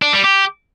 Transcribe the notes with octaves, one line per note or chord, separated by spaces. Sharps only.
D4
G3
G4